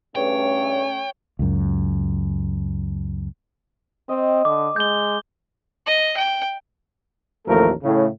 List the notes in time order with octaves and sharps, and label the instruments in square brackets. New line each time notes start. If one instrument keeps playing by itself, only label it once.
[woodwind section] E2 G2 [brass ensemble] A3 C#4 [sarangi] C#5 [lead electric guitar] G5
[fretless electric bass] C#2 F#2
[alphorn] C4 [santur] D#5 G5
[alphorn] D3 [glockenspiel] D6
[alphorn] G#3 [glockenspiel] G6 G7
[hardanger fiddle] D#5
G5
[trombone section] A1 D#2 F3 A3 A4 A#4
A2 C#3